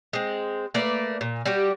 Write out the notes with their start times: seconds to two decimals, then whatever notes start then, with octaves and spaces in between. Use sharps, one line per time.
0.13 G#3 C4
0.74 A3 A#3 B4 D5
1.21 A#2
1.45 G3 F#4 G4